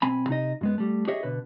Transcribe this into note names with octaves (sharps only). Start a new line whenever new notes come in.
B1 C4 G#5 B5
C3 D#4 D#5
F#2 G#3 B3
G3 A3
G4 G#4 C#5 D#5 E5
B2 D3 B4